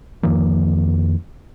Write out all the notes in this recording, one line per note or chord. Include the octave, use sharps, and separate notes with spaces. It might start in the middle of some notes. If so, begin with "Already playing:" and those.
F2 D#3 F3 A#3